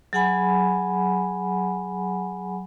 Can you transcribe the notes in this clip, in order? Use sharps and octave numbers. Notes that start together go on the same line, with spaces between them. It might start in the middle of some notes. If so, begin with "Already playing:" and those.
F#3 G#4 F#5 G#5 B5